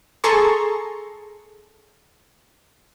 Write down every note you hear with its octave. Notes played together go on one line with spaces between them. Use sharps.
G#4 A4 A5 A#5 C6 C#6